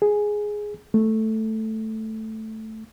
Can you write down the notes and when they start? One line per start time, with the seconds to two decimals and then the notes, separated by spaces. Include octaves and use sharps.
0.02 G#4
0.94 A3